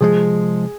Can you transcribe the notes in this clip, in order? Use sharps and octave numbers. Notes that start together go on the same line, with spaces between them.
C3 F3 G#3 G#4